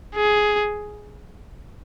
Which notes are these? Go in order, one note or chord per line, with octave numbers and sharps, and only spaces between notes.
G#4